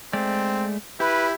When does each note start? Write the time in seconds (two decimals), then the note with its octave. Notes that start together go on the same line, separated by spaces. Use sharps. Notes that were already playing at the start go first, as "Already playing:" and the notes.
0.13 G#3 A3 C4 D5
1.00 E4 G4 B4